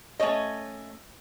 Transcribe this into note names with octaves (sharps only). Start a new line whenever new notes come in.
A3 C#4 C#5 D#5